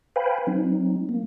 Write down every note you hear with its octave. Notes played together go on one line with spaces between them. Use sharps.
B4 C5 F5 G5 G#5 B5
F#3 C4 D#4
A#3